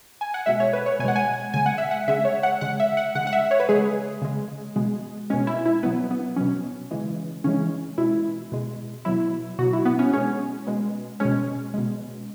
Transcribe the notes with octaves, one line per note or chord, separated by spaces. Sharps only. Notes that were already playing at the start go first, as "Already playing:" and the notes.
G#5
F#5
B2 G#3 E5
C#5
B4
C#5
B2 G#3 F#5 G#5
G#5
C#3 G#3 G#5
F#5
E5
F#5
C#3 G#3 E5
C#5
F#5
C#3 G#3 F#5
E5
F#5
C#3 G#3 F#5
F#5
E5
C#5
B4
C#3 G#3 G#4
C#3 G#3
B2 G#3
B2 G#3 C#4
E4
E4
B2 F#3 B3
B3
B2 F#3 C#4
C#3 E3 G#3
C#3 E3 G#3 C#4
B2 G#3 E4
B2 G#3
B2 F#3 E4
B2 F#3 F#4
E4
B3
C#4
B2 G#3 C#4
B2 G#3
B2 G#3 C#4
B2 G#3